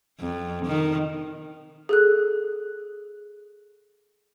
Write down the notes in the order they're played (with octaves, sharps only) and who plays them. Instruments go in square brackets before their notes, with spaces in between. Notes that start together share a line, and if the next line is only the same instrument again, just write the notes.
[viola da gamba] F2
D#3
[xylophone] G#4 A4 F#6